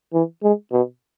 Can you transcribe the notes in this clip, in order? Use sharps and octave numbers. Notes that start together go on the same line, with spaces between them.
E3
G#3
B2